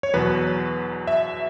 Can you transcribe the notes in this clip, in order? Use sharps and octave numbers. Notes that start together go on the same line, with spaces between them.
C#5
E2 B2 F#3 B4
E5